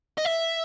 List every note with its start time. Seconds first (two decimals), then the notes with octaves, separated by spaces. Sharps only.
0.18 D#5
0.25 E5